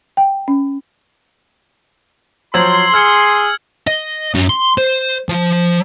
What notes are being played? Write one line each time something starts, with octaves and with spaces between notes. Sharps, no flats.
G5
C#4
F3 F#3 C5 C6 E6 G#6 F#7
G#4 E6 F6 G#6 C#7
D#5
F#2
C6
C5
F3